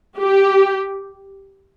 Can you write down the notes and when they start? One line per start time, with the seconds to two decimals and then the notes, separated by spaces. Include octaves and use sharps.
0.18 G4